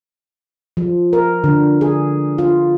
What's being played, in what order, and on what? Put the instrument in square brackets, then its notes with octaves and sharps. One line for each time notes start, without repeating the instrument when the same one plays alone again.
[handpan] F3
A#4
D3
G#4
F4